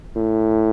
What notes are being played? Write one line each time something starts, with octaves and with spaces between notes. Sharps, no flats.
A2